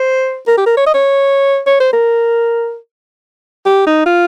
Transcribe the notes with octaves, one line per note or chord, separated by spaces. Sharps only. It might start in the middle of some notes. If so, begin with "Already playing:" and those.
Already playing: C5
A#4
G4
A#4
C#5
D#5
C#5
C#5
C5
A#4
G4
D#4
F4